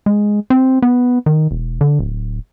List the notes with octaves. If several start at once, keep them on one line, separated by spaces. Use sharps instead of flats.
G#3
C4
B3
D#3
E1
D3
D1